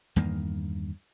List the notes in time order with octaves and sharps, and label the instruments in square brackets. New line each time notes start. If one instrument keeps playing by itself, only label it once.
[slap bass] E2 G2 D#3 A#3